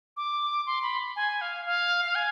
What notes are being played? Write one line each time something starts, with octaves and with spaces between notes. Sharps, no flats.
D6
C6
B5
G#5
F5
F5
F5
G#5